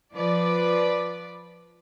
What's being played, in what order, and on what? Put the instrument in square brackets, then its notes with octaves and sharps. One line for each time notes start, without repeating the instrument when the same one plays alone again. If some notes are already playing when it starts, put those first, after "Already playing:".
[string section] F3 B4 D5